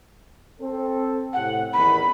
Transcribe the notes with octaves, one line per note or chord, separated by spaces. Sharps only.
C4 A4
A2 C3 F#5
A1 E2 D#3 B5